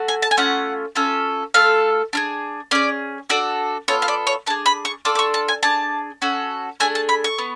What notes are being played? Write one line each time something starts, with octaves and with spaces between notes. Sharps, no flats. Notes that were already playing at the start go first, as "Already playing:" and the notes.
Already playing: A3 F#4
G#5
A5
G#5
A3 C#4 F4 F#5
C#4 F4 A4
A3 F4 A4 F5
D4 F4 G#4
C#4 G#4 D5
D4 F#4 A4 D5
B3 F4 A4 C#5
F5
D5
C#5
D4 G#4 A5
B5
C#6
D4 F4 A4 D6
D6
C#6
A5
G#5
D4 G#4 A5
C#4 F#4 A4
A3 D4 G#4 G#5
A5
B5
C#6
B3